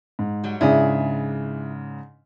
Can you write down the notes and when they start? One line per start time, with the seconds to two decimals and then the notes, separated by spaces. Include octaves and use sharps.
0.19 G#2
0.44 F#3 G3
0.61 G#2 C#3 D4 E4 G#4